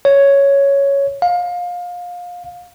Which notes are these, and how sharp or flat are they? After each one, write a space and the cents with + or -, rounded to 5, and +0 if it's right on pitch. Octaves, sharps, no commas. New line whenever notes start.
C#5 +5
F5 +25